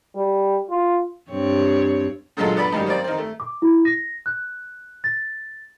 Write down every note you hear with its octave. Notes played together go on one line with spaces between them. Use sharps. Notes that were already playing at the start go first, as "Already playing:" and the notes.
G3
F4
G2 C4 C#5
A#2 D3 F#3 G#3 F4 A4
D3 B3 D5 B5
G#2 D#3 F#3 G3
A#3 C4 D5
D#3 C4
A3
D6
E4
A#6
F#6
A6